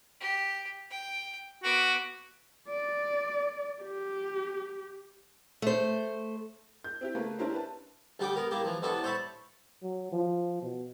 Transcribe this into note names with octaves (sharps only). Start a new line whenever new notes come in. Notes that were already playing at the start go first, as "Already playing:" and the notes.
G4
G5
B3 F#4 D6
D5
G4
A3 C5
G6
C4 E4 G4
C#3 A3 A#3 B4
C#4 D4 E4 G4 A#4 C5
B4 A5
D2 G3 G4 F#5 G5 D6
B3 A#4
A#3 E4 G4
E3 F3
C2 B3 D4 E4 A4 C#6
C5 C#5 E5 A5 B5 C#6
F#3
F3
B2